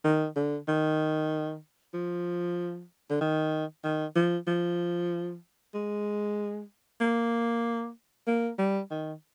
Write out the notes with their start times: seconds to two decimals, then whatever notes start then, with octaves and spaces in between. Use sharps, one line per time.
0.04 D#3
0.36 D3
0.68 D#3
1.94 F3
3.10 D3
3.21 D#3
3.84 D#3
4.16 F3
4.48 F3
5.74 G#3
7.01 A#3
8.27 A#3
8.59 G3
8.91 D#3